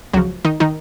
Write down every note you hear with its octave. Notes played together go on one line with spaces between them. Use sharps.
C#2 C#3 F3 F#3 F#4
D#3 D#4
D#3 D#4